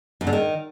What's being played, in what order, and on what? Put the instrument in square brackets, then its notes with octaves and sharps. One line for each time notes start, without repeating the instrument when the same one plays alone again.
[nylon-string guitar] F#2
D3
D#3